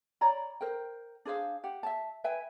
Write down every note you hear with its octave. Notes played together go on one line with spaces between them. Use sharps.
C#5 D5 A#5 B5
A#4 C5 G5
D4 G#4 C5 F5
G4 F#5
E5 A5
B4 E5 G5 G#5